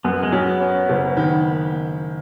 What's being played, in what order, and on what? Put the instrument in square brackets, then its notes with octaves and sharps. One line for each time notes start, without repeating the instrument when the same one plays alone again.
[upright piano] F#2 [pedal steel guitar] B3
[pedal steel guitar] G#3
[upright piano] F#3 [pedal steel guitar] C#4
[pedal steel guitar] B3
[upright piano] C#4
F#1
D#3